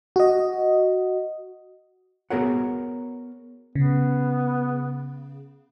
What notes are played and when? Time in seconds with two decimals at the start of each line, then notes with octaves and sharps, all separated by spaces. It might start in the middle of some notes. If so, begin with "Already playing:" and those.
0.16 F#4 D#5
2.30 B3 F#4 G#4 A#4 C#5 F#5
3.75 C#3 B3